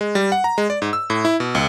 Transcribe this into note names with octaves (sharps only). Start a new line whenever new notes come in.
G#3
G3
F#5
A#5
G#3
D5
G#2
E6
A2
E4
B2
C#2